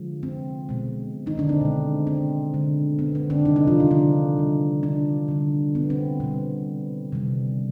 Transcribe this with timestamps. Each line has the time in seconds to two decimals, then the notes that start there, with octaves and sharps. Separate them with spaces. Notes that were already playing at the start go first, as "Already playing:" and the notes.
Already playing: D3 F3 G#3
0.23 C4
0.69 B2 G#3
1.26 D#3 D#4
1.38 D3 D4
1.49 C4
1.61 B2 G#3
2.07 C4
2.54 D3 G#3
2.99 B3
3.15 C4
3.30 D3 D4
3.45 C3 D#3 G3 D#4
3.56 D#3 D#4
3.67 F3 F4
3.79 D#3 D#4
3.91 D3 D4
4.38 B2 G3
4.83 D3 D4
5.28 D3 G3
5.75 B3
5.90 C4
6.20 B2 G3 B3
7.12 C3 D#3 G3